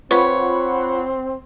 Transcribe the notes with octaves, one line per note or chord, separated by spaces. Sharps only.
C4 F4 B4 C#5 F#5 B5